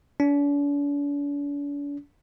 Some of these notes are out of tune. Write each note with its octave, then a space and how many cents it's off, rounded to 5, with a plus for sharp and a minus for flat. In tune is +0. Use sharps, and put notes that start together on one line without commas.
D4 -45